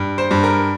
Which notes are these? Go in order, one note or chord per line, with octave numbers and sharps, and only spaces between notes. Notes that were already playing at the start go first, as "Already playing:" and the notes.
Already playing: G2
C5
G2
A#4